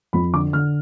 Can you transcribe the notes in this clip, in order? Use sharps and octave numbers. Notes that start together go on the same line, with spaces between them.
F2 B5
D3 D6
D3 F6